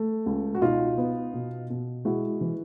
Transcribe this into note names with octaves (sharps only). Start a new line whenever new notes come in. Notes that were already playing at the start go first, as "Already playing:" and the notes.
Already playing: A3
C#2
F#4
B2 D#4 F4
B3
B2
B2
G#3 E4 F#4
E3